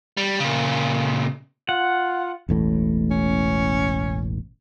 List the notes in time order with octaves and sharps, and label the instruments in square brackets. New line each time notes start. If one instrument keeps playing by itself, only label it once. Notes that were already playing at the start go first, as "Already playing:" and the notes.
[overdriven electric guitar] G3
A#2 C#3
[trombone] F4 [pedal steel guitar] F#5
[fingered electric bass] E1 A1 A2
[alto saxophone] C#4